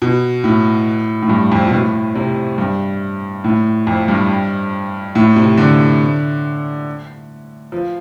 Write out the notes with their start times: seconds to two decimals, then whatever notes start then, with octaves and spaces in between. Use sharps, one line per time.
0.02 B2
0.44 A2
1.23 A2
1.29 G2
1.52 F2
1.68 B2
1.72 A2
2.15 C3
2.58 G2
3.44 A2
3.87 F2
4.08 G2
5.15 A2
5.36 C3
5.57 D3
7.72 F3